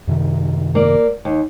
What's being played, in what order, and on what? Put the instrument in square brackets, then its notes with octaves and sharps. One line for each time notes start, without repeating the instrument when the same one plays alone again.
[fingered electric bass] F#2 C3 D#3
[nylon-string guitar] A#3 D5
D#2